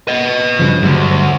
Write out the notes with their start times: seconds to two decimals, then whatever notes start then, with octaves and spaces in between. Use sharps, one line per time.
0.08 B4 D#5
0.59 G2 C#3 F3
0.82 D2 G2 F#3